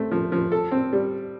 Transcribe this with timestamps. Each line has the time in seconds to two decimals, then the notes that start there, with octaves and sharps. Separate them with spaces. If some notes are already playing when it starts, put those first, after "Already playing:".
Already playing: A3 C4
0.11 F3
0.32 F3
0.52 A4
0.72 C4
0.93 G3